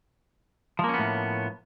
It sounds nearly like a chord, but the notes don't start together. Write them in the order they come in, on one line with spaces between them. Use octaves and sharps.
F3 A#3 C#4 B3 A2